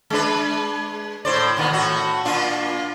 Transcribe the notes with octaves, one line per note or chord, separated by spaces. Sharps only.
G#3 D4 B4
A2 C5 D5
A#2 D#3 B3
A2 F#4
A#2 D4 F4